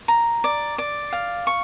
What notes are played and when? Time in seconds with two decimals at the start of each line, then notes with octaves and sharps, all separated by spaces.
0.08 A#5
0.44 D5
0.78 D5
1.13 F5
1.47 C#6